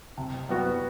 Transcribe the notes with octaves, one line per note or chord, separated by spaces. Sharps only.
C3
G3 B3 F#4